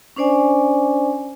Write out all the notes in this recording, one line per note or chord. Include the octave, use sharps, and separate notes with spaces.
C#4 D4 C5 D5 G#5